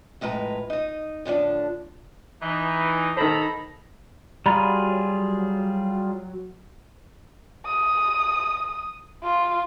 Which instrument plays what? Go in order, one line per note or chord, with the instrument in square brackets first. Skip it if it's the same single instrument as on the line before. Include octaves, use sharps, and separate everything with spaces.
[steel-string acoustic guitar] F2 A2 G#3 B4 A#5
D#4 D#5
A2 D3 F3 D4
[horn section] E3 D#4
[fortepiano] D#3 C5 [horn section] A4 A#5 B5
[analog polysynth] F#3 [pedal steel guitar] G3 F4 G#4 [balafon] A#5 B5
[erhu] D#6
F4